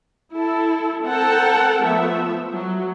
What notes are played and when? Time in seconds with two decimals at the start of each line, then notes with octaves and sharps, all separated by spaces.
0.33 E4 A4
1.05 C4 A4 A#4 F#5 G5 A5
1.83 F3 A3 B3 E5
2.54 F#3